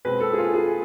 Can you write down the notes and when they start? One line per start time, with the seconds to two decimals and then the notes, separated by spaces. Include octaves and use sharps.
0.05 B2 G#3 C4 B4
0.20 A4
0.33 G#4
0.38 F4
0.54 G#4